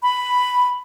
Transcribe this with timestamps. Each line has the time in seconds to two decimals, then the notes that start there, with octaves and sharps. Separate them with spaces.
0.03 B5